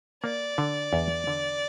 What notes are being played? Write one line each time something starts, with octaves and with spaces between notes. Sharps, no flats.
A#3 D5
D3
E2
D3